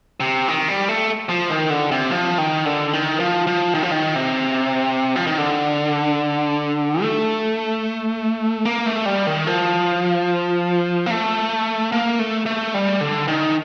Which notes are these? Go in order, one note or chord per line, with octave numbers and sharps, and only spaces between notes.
C3
D#3
G3
A3
F3
D#3
D3
C3
F3
D#3
D3
D#3
F3
F3
D#3
F3
D#3
C3
F3
D#3
D3
A3
A#3
A3
G3
D#3
F3
A#3
A3
A#3
A3
A3
G3
D3
D#3